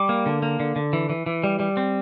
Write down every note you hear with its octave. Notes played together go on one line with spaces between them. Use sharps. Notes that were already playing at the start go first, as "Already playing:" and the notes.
Already playing: G3 D6
A#3
D3
A#3
D3
D3
E3
E3
E3
G3
G3
C4